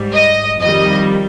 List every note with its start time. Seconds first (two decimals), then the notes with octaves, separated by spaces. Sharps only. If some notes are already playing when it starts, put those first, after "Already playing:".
Already playing: G#2 G3
0.13 D#5
0.60 F2 D#3 G3 D#5